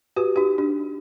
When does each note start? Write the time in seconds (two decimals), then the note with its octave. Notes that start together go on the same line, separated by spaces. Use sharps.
0.16 F#4 G4 B4
0.36 D#4 G4
0.58 D4